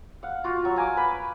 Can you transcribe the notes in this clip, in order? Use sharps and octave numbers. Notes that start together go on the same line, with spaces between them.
F5 F#5
F4 F#4
F#3 C#6
F5 G#5 A#5 D6
B4 B5